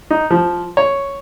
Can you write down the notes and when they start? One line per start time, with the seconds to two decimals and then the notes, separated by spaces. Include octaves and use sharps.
0.11 D#4
0.30 F3
0.77 C#5